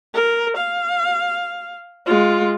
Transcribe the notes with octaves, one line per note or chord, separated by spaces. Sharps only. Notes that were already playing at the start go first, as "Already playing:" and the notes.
A#4
F5
G#3 F4